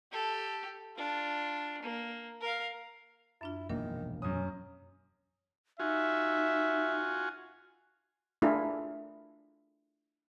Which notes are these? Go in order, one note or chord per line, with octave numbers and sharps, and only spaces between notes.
G4 A4
D4 F4
A#3
A#4 F5
F#2 D4 E4 F4
E1 A#1 D#3 A#3 D4 A#4
F#2 C#4 D#6
D#4 F4 F#4 E5 G#5
A3 D4 E4 F4 G#4 A#4